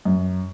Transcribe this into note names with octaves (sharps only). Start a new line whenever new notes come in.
F#2